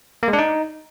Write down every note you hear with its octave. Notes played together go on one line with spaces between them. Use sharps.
A#3
G#3
D4
D#4